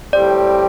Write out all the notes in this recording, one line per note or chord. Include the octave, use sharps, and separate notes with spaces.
A2 G3 C4 G4 D5